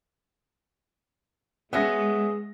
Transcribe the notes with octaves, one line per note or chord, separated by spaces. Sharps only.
G#3 B3 C#4 F#4 G#4 E5 A#6